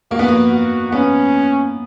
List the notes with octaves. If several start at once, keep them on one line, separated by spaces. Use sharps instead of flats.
A#3 F#4
B3
A#3
F#4
B3 C#4